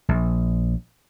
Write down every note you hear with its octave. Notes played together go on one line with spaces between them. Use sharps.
A#1